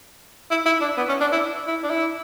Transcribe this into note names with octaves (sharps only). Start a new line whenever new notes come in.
E4
E4
D4
B3
C#4
D4
E4
E4
D4
E4